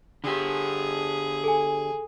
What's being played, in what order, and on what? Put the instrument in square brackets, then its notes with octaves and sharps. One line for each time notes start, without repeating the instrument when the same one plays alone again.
[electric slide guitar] D3 G4 [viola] G#4
[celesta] A4 G#5